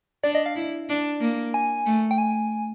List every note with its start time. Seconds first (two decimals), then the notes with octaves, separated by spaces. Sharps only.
0.24 D4 D5
0.35 D#5
0.46 F5
0.56 E4
0.89 D4
1.21 A#3
1.54 G#5
1.86 A3
2.11 G5
2.18 G#5